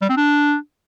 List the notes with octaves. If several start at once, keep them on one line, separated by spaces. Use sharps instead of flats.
G3
C4
D4